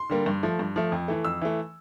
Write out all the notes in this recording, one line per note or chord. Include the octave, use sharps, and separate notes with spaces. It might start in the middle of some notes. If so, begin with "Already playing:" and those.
Already playing: C6
D3 G3 A#3
G2
F3 A3
G2
F3 A3
F2
E3 A3
F2 E6
E3 A3